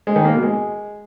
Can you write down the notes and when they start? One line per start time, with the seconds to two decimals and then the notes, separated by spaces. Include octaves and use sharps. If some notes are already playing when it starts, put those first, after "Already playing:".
0.07 G#3
0.16 D#3
0.25 A#3
0.34 B2
0.43 G#3